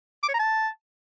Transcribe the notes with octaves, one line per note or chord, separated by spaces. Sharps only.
D6
C#5
A#5
A5